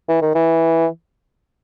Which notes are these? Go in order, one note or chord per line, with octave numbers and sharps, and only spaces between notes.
E3
D#3
E3